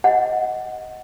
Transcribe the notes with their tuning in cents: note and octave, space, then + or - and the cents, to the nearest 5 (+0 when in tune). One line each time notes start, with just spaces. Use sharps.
D#5 +15 F#5 +0